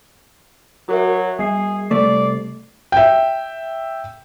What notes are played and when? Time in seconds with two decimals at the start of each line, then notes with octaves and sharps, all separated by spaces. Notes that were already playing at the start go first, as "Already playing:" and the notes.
0.89 F#3 F#4 A#4 E5
1.39 G3 G#4 C7
1.91 C2 A3 D5
2.92 E5 G5